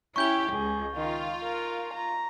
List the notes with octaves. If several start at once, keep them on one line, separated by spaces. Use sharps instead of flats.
C#4 E4 G4 C#6 G6 G7
C#2 G#4
D#3 F4
A#4
A#5